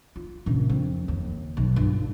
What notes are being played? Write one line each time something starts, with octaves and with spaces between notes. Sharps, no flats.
F4
A#1 C#3
F2
D#2
B1
G1